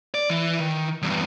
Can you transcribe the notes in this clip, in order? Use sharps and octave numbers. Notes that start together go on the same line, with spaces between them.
D5
E3
D#3
E2 G2